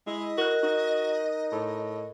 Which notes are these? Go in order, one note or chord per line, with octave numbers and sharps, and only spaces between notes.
G#3 E4 D#5
F#4 A#4 F#6
D#4 F#4
A2